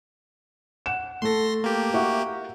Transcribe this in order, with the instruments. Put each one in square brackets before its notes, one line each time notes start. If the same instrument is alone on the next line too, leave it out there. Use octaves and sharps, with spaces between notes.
[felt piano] F#5 E7
[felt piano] A3 A4 [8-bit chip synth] C6 A#6
[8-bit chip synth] A#3 G4
[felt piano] F#4 E5